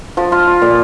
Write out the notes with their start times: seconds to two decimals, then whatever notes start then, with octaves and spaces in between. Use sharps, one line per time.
0.17 F3
0.32 F4
0.47 F4
0.62 A#2